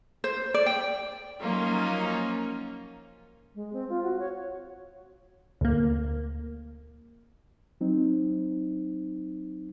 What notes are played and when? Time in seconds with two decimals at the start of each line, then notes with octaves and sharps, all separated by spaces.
0.24 C5
0.54 D5
0.66 G5
1.40 F3 F#3 A#3 C#4 D#4 F4
3.55 G#3
3.73 C4
3.89 F4
4.03 F#4
4.19 C#5
5.61 D2 A#3
7.81 F#3 C4 D#4